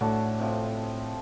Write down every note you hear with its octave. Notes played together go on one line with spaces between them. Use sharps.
A2 D3 F#4 A5
C3 F3